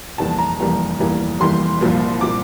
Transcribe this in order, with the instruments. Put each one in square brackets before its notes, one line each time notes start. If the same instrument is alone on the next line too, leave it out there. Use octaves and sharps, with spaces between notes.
[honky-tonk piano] F1 E2 E3 G3 A#3 A5
A#5
F1 E2 E3 G3 A#3
F1 E2 E3 G3 A#3
F1 E2 E3 G3 A#3 C6
C2 A#2 F3 A#3
A#2 F3 A#3 D6